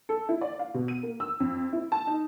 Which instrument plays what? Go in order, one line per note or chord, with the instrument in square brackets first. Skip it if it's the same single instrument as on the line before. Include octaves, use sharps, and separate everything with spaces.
[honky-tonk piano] A4
E4
D5
F5
B2
D#7
A#3
E6
F2
E4
A5
D#4